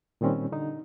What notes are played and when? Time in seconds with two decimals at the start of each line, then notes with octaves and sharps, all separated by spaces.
0.21 A#2 D#3 G3 C4 C#4
0.52 D3 D#4